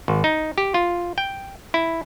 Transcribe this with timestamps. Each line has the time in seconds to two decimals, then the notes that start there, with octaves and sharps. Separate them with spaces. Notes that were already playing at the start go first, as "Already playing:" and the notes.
0.08 G#1
0.24 D#4
0.58 G4
0.74 F4
1.18 G5
1.74 E4